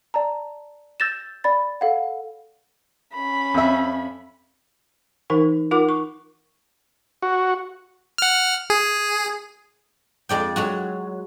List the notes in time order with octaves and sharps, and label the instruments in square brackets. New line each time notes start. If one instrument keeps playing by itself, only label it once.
[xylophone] D5 A5 A#5
E6 G6 A6 A#6 E7
D5 B5 A6
A4 F5 F#5
[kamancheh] C#4 B5
[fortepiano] F2 E5
[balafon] E3 D#4 A#4 C5
D#4 F4 A#4 F#5 D6
C#6
[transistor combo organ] F#4
[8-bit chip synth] F#5 F6
G#4
[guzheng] F2 G#3 D5 G5
F#3 G#3 F#4